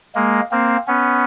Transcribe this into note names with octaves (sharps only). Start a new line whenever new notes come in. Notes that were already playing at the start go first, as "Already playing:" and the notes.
G#3 A#3
A#3 C4
B3 C#4